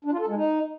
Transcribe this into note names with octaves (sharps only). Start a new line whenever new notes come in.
D4
F4
A4
G#3
D#4